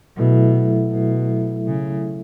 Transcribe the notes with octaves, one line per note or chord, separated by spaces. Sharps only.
B2 F#3 A3 E4 A4 E5
B2
C#3